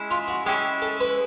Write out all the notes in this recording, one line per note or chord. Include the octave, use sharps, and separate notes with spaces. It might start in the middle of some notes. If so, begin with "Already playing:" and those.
Already playing: G#3 C#4 E4
F4
F#4
G#3 C#4 E4 G4
A4
B4